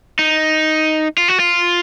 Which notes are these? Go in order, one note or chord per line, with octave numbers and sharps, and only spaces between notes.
D#4
F4
F#4
F4